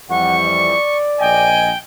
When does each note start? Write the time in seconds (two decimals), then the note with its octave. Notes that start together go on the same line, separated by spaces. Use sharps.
0.10 F2 E3 G3 F#5 C#6
0.46 D5
1.20 A#1 D#5 G5 G#5